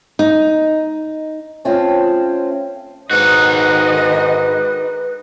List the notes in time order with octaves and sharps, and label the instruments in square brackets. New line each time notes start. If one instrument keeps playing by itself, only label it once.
[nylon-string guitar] D#4
[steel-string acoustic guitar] A3 C4 C#4 F4
[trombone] G#2 [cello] D#3 D#5 [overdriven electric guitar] D#4 F#4 [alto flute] B4